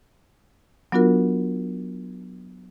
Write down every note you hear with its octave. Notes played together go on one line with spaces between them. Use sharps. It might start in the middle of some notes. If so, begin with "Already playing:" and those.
F#3 B3 D4 F4 F#4 A#4